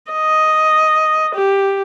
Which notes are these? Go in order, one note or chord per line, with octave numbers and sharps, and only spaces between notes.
D#5
G4